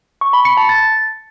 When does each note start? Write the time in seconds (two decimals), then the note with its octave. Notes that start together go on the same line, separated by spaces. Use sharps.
0.21 C#6
0.33 B5
0.45 C#7
0.57 A5
0.69 A6